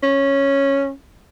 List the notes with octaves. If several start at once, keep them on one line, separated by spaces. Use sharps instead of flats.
C#4